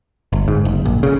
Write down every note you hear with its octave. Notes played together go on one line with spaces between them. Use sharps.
G1
G#2
F#1
A#1
C#3